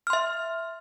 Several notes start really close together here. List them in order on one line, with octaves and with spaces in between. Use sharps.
F6 C6 E5